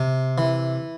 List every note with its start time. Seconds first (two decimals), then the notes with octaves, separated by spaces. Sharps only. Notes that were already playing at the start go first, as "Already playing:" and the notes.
Already playing: C3
0.38 E3